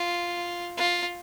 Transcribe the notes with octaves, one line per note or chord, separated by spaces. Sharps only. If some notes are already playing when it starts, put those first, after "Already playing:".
Already playing: F4
F4